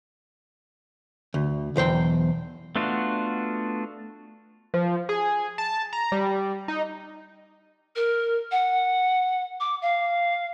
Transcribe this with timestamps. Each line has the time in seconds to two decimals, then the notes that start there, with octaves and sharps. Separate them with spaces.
1.34 D2
1.76 B1 E2 C5 G5
2.76 A3 B3 D4 F4 F#4
4.74 F3
5.09 G#4
5.58 A5
5.93 A#5
6.12 G3
6.68 D#4
7.96 A#4
8.51 F#5
9.60 D6
9.82 F5